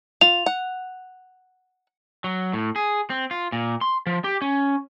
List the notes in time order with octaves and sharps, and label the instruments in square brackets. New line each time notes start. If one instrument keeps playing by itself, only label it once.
[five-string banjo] F4 [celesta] F7
[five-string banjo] F#5
[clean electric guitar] F#3
A2
G#4
C4
F4
A#2
C6
F3
G4
C#4